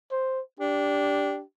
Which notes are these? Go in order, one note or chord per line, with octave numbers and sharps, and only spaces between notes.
C5
D4 G4